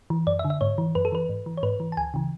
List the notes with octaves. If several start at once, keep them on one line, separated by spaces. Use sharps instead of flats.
E3
F#2 D5
E5
D3
E5
G#2 C#5
E3
F#2 B4
A4
E3 B4
G#2
E3
C#5
G#2 B4
E3
A5
D2 G#5
C#3 E3